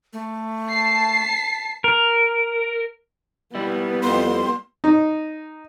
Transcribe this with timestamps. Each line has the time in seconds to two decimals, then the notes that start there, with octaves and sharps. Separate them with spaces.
0.13 A3
0.68 A5 C7
1.84 A#4
3.55 G3 B3 E4
4.03 F2 C6
4.84 D#4